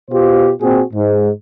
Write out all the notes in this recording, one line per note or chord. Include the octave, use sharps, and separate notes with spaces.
B2 F4 G4 C5
A#2 C4 F#4 G#4
G#2